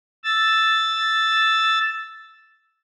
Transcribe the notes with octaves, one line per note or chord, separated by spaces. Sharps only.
E6 A6